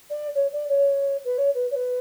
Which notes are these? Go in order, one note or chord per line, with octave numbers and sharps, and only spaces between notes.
D5
C#5
D5
C#5
B4
C#5
B4
C#5
B4